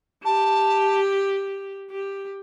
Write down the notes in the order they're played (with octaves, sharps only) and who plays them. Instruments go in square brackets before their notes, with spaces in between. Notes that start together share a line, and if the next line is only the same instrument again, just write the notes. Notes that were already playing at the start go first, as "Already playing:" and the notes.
[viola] G4 [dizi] A5
[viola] G4